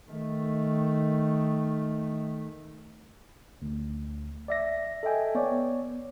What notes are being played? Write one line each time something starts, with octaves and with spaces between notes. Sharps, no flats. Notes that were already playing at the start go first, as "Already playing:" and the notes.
D#3 A3
D2
D5 E5 A#6
A4 D#5 E5 G5 G#5
B3 C#5 D5